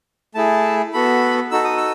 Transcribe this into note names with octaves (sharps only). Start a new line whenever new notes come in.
A3 E4 G#4 A5
B3 F#4 A4 B5
D#4 F#4 A4 E6
D#6
E6